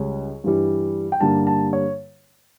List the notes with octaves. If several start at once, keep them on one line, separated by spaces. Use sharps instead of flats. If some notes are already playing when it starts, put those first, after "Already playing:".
Already playing: C#2 C#3 G3 C#5
G2 E3 G3
G5
G2 D3 G3 A#3 A5
A5
C#5